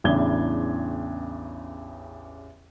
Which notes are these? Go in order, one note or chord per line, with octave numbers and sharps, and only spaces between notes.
A1 E2 C#3 D4 G#6 G7